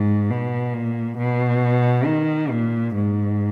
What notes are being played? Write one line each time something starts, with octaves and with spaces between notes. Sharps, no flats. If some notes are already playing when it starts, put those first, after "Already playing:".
Already playing: G#2
B2
A#2
B2
D#3
A#2
G#2